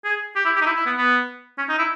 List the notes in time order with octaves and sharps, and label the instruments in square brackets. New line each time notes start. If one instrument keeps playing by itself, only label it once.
[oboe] G#4
G4
E4
G4
D#4
E4
E4
B3
B3
C#4
D#4
E4